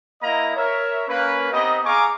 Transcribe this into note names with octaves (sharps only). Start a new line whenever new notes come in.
A#3 E4 D#5 A#5
A#4 C#5 E5
A#3 C#4 B4
B3 C4 D#4 G4 D#5
G#4 F5 G#5 A#5 C#6 D6